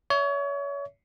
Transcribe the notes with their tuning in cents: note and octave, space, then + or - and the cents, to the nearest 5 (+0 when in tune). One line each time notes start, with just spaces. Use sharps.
C#5 +30 E5 -5